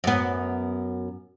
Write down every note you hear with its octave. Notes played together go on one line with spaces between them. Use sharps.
F#2 B3